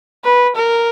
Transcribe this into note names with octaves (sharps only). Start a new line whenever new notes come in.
B4
A#4